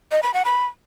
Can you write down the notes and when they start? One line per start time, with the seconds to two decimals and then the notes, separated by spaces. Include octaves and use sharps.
0.11 D#5
0.23 B5
0.34 F#5
0.45 B5